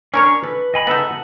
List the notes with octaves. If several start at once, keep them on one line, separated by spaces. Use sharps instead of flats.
C#4 D4 A#4 C#5 C#6
A4 B4
D#5 G#5 B5
C#3 B3 D#4 A4 E5
F#5